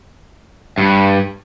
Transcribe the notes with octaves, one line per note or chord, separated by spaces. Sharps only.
G2